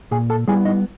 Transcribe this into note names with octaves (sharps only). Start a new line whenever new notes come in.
A#2 G#4 G#5
A4 A5
G3 B3 E4 G#4 G#5
D#4 D#5